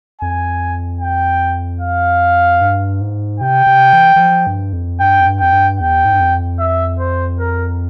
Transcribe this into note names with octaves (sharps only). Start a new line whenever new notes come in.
F2 G#5
G5
F5
G2
G#2
C3 G5
C3
E3
E3
F3
G2
F2
G2 G5
F2
G2
F2 G5
G2
E2 G5
G#2
G2
F2
E5
C5
A#4